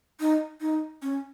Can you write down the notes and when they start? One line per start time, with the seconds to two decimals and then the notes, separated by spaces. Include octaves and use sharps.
0.20 D#4
0.61 D#4
1.02 C#4